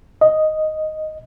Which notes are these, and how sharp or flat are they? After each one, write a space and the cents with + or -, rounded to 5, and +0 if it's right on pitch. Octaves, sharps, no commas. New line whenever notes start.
D#5 +0